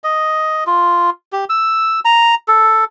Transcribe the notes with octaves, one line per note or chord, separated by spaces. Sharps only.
D#5
F4
G4
E6
A#5
A4